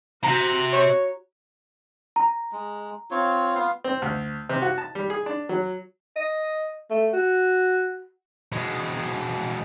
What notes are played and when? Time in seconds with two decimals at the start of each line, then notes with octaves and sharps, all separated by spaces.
0.23 C3 F#4 A#5
0.73 C#5
2.16 A#5
2.52 G#3
3.11 C4 F4 C#5
3.55 B3 F4 F5
3.84 C4
4.02 D2
4.49 C3
4.62 F#4
4.78 A5
4.95 G3
5.10 G#4
5.26 D4
5.49 F#3
6.16 D#5
6.90 A3
7.13 F#4
8.52 B2 G#3